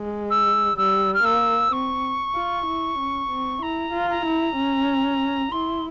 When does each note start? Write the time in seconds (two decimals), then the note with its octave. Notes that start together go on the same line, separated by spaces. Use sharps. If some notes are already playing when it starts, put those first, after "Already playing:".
Already playing: G#3
0.30 E6
0.76 G3 E6
1.13 F6
1.24 A#3 E6
1.72 C4 C#6
2.35 F4
2.67 E4
2.99 C#4
3.30 C4
3.62 E4 A#5
3.93 F4
4.10 A#5
4.26 E4
4.57 C#4
5.51 E4 C6